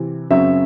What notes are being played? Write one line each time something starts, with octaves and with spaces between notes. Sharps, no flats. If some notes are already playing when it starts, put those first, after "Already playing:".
Already playing: C3 E3 C4
F#2 C#3 F#3 C4 E5